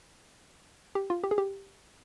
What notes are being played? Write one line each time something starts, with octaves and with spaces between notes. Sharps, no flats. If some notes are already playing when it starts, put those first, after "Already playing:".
G4
F4
G4
G#4
G4